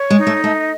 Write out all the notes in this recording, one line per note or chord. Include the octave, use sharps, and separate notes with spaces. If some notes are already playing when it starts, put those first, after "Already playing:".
Already playing: C#5
G#3
D#4
A3
A3 D#5